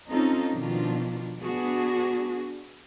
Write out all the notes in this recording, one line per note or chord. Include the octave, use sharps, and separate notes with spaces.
C4 C#4 D#4 F4 A4
B2 D#3 F3 D4 F4
B3 D4 F#4 G#4